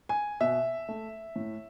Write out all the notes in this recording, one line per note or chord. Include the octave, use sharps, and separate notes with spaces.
G#5
B2 E5
A3
A2